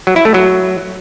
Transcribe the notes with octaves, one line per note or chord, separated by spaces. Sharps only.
F#3
E4
A3
F#3